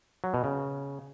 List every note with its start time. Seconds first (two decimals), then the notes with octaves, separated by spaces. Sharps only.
0.24 F#3
0.34 B2
0.44 C#3